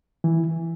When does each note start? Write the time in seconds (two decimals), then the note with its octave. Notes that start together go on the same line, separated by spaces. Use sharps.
0.24 E3